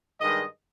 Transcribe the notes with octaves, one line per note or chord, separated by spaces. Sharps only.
G2 D#3 G#3 D#5